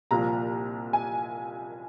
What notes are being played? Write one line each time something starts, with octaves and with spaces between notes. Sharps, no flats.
C2 A#2 F3 A#5
G#5